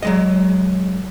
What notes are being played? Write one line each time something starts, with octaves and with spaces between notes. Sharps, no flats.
F#3 G#3 D#5